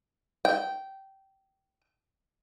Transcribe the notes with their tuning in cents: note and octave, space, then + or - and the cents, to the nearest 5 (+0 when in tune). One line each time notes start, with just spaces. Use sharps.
G5 -15